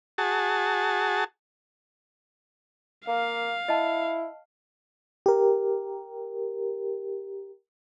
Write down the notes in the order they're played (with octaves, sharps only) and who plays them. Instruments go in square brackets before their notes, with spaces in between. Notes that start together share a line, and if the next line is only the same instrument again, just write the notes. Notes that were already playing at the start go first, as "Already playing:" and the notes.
[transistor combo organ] F#4 G#4 A5
[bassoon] A#3 [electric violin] F5
[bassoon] E4 [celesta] D#5 A5
[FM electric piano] G4 A#4